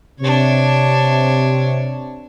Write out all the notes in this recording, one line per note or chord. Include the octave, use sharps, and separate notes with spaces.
C3 D4 C#5